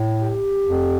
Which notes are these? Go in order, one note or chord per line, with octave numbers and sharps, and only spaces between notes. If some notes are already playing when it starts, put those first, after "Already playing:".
Already playing: A2
G4
F2